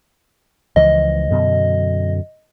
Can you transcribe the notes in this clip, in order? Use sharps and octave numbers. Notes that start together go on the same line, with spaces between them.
C#2 E3 F3 D#5
F#2 B2 D3